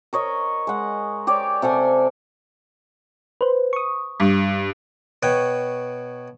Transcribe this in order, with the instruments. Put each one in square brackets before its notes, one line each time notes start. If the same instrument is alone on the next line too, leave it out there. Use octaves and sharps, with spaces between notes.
[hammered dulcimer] A#4 C#5 D#5
G#3 F#5
G4 C#5 D5
C3 A4 F#5 G#5
[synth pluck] B4 C5
C#6 D#6
[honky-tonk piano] G2
[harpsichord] B2 B4 C#5 G5